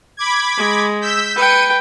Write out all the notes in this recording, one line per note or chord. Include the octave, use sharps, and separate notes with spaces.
B5 D6 G#6
G#3
E6 G6 B6
B4 G5 C#7 D#7